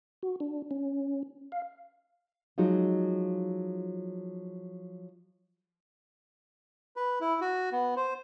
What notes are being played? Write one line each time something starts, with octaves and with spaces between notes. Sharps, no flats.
F#4
D4
C#4
F5
F3 F#3 G#3 D#4 F4
B4
E4
F#4
B3
C5